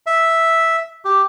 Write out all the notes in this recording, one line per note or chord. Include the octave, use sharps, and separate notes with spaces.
E5
G4